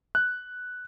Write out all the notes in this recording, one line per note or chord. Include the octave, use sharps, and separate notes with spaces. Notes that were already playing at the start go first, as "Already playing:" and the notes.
F#6